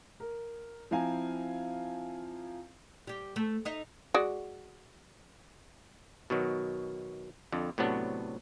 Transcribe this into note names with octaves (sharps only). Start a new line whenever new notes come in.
A#4
F3 C4 E4 F5 G#5 A#5
G3 G4
A3
D#4 D#5 E5
G#3 F#4 D5
B2 D#3 F#3
F2 D3
A2 C3 F#3 B3 D4